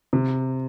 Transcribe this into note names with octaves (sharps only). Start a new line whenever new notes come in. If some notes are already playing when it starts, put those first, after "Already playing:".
C3